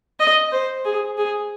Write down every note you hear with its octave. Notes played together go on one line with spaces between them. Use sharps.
D#5
C5
G#4
G#4